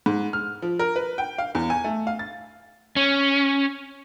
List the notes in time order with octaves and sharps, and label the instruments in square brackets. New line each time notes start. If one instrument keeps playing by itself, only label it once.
[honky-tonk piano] G#2
F6
F3
A#4
B4
G5
F5
E2
G#5
A3
F5
A6
[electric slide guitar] C#4